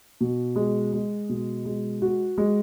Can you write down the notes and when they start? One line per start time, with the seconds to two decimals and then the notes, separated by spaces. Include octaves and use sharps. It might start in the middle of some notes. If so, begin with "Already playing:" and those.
0.21 B2
0.56 G#3
0.93 G#3
1.29 B2
1.65 G#3
2.02 F#4
2.38 G#3